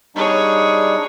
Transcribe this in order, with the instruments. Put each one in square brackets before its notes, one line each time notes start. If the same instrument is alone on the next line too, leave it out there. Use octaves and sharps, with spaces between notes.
[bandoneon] G3 D4 D#4 [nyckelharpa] G#4 C#5